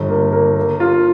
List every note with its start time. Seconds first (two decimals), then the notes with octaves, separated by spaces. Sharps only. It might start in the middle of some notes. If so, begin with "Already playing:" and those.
Already playing: G1
0.09 A#3
0.33 A#3
0.56 A#3
0.80 F4